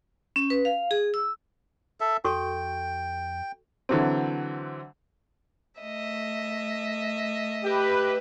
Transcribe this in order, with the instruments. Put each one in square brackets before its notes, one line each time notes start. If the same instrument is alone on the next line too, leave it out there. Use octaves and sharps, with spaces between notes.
[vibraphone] C#4
B4
F5
G#4
E6
[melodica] A4 E5
[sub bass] F2 [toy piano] F#4 A4 C#6 [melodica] G5
[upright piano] D3 E3 F#3 C4
[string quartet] A3 D#5 E5
[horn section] G4 [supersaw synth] B4